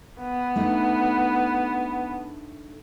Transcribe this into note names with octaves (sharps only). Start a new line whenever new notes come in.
B3
A3 D4 D#4